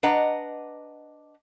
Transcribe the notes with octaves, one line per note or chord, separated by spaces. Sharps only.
D4 B4 D#5 F#5 A#5